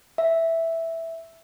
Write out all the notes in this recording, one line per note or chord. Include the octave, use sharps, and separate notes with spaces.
E5